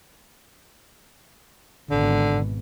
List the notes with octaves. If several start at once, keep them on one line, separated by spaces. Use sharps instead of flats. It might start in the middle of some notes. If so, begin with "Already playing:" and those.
G#1 G#2 B2 D3